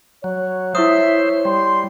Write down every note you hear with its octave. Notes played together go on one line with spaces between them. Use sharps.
F#3 C#5
E4 C5 E5 C#6 D#6
G3 C6